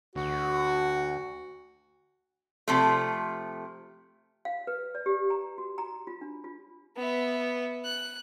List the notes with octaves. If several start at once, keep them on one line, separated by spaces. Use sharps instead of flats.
D2 F#4
C3 F3 A3
F5
B4
D5
G4
A#5
F#4
A#5
F4
D4
F4
B3 E5
F#6